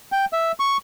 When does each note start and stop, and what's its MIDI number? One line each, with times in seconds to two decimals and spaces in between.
0.12 0.25 79
0.33 0.52 76
0.60 0.77 85